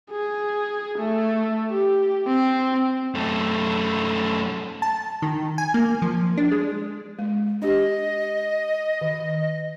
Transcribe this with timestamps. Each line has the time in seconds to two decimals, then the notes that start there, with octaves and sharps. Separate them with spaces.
0.11 G#4
0.98 A3
1.71 G4
2.27 C4
3.15 F#2 A3
4.82 A5
5.22 D#3
5.58 G#5
5.74 A#3
6.02 F3
6.38 D4
6.52 G#3
7.19 G#3
7.62 D4 G4 D#5
9.01 D#3